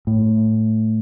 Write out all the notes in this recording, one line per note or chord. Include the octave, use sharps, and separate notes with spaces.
A2